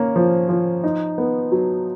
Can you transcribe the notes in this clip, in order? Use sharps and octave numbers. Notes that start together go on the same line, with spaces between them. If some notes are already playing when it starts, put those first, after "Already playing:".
Already playing: A#3 C#4
F3
F3
D#4
B3
F#3